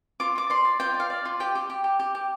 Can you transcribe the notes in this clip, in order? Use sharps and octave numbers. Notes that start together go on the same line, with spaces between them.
F4 D6
F4 D6
D5 C6
D5
F4 G5
D5
F5
D5
F4
G4 G5
G4
G4
G4
G4
G4